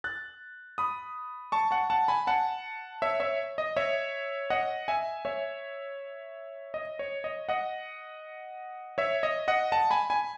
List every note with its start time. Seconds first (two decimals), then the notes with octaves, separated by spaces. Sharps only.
0.04 F#6 A6
0.78 B5 D#6
1.52 A5 C#6
1.71 F#5 A5
1.90 F#5 A5
2.08 G#5 B5
2.27 F#5 A5
3.02 C#5 E5
3.20 C#5 E5
3.58 D#5
3.76 C#5 E5
4.50 D#5 F#5
4.88 E5 G#5
5.25 C#5 E5
6.74 D#5
6.99 C#5
7.24 D#5
7.49 D#5 F#5
8.98 C#5 E5
9.23 D#5
9.48 D#5 F#5
9.72 F#5 A5
9.91 G#5 B5
10.10 G#5 B5